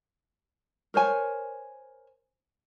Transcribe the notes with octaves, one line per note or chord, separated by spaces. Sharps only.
A#4 C5 C#5 G#5